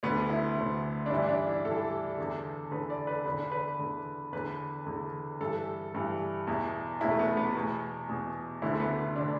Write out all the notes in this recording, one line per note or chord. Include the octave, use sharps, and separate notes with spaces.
D2 D3 B3
E4
D2 D3
D4
G2 E3 E4
D4
E4
G2 E3 A4
E2 D3
E2 D3 B4
D5
B4
E2 D3 B4
D5
B4
E2 D3
E2 D3 B4
E2 D3
G2 E3 A4
G2 E3
E2 B2 E4
E2 B2 E4
A3
B3
B3
E2 B2
E2 B2
D2 D3 E4
A3
B3
B3
D3 D4